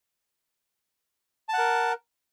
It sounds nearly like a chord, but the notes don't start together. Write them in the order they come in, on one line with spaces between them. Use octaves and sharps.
A5 F#5 A#4